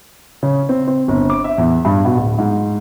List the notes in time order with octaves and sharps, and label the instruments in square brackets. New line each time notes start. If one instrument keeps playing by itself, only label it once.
[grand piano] C#3
C4
C4
G1
D6
E5
E2
G2
B2
D1
G#2